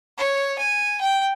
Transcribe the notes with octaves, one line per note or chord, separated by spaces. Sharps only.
C#5
G#5
G5